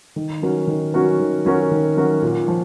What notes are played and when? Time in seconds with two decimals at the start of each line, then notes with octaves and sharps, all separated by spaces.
0.16 D#3
0.42 F#3 C#4 F#4 A#4
0.67 D#3
0.94 F#3 C#4 F#4 A#4
1.19 D#3
1.45 F#3 C#4 F#4 A#4
1.71 D#3
1.97 F#3 C#4 F#4 A#4
2.22 A#2
2.48 F3